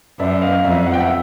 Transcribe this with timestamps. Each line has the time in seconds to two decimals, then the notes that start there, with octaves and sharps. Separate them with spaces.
0.19 F#2 D5 E5
0.42 D#5 F5
0.53 F5
0.64 F2 D5 E5
0.86 F#5
0.93 G5
1.00 E5 F#5